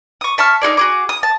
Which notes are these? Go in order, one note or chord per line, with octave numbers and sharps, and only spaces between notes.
C#6 D#6
E5 A5 C#6 F6
D#4 F#4 G#4 D5
F#4 G#4 D6
D#6
A5